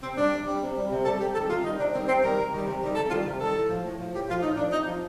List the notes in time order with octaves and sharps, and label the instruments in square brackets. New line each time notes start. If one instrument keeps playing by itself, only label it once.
[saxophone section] C3 C4
G3 D4
C3
G3
C3
G3
C3
G3 A4
C3 G4
D#3 A4
G3
C3 F4
D#3 G3 D#4
C3 D4
D#3 G3 C4
C3 C4
D#3 G3 A#4
C3
D#3 G3
C3
D#3 G3
C3 A4
D#3 F4
G3
C3
D#3 G3 A4
A2
F3
A2
F3
A2 G4
F3 F4
A2 D#4
F3 D4
C3 D#4
F3